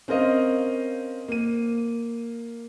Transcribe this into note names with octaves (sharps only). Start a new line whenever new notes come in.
C4 C#4 A#4 C5 D#5 F5
A#3 D#7